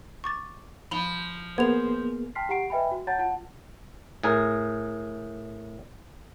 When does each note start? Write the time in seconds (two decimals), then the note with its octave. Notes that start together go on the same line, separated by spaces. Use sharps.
0.24 C#6 D6 A6
0.91 F3 B5 F7 G7
1.58 A#3 B3 G#4 C5 G#6 F7
2.35 G5 A5 C6 F6 B6 C7
2.49 G4 F#5 A#5 C7 D7
2.70 B4 D#5 E5 G5 G#5 B5
2.91 F#4
3.07 C#5 F#5 A5 A#5 G6 A6
3.19 F4 F#5 A5
4.23 A2 G#4 A#4